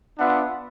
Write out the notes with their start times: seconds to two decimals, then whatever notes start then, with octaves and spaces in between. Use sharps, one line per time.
0.19 B3 D4 F4 E5 F#5